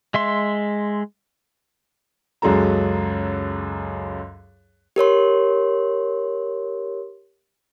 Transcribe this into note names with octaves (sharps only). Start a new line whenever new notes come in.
G#3 E5 C6
C#2 F#2 F#3 G#3 A4 A#5
G4 A#4 C#5 C6